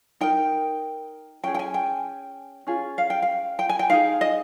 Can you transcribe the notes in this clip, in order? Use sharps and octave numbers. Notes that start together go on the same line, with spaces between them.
D#4 A#4 G5
C#4 G#4 G5
G5
G#5
G5
C#4 F4 G#4
F5
G5
F5
G5
G#5
G5
D#4 G#4 F5
D#5